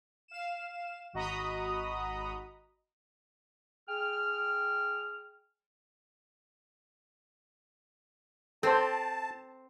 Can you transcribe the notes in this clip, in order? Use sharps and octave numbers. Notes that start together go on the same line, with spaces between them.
F5 E7
G#1 F#4 D#5 A#5 B5 D#6
G#4 G5 F6
C4 A4 C5 A5